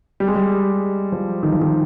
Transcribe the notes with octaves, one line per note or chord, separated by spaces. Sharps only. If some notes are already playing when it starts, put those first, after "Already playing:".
G3
G#3
G3
F3
D#3
F3
D#3